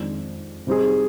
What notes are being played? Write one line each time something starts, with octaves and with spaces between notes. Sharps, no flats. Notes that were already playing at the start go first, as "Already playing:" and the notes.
Already playing: F2 D#3 G#3 D4
C3 G3 C4 D#4 G#4